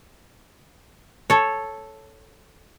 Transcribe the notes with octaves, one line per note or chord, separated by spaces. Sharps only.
A4 C#5